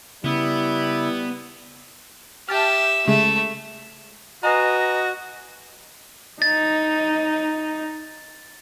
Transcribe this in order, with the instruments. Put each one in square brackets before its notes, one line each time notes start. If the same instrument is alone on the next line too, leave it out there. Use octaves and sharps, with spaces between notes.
[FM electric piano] C#3 [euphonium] G3 [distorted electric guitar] B3 [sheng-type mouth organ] E4
[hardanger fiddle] G4 E5 [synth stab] G5 A5 F6
[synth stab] C#3 G#3 [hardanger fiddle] A3 E5
[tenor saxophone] F#4 [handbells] B4 G#5 A#5 [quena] D#5
[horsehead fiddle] D#4 [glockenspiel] A6